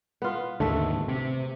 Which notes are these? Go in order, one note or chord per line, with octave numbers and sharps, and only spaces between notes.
B3 F4
D#2 G#2 D3 A3 E5
C3